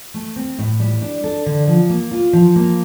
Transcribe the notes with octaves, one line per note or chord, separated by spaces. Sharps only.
A3
C4
A2
G3
D4
A4
D3
F3
A#3
F4
F3
A#3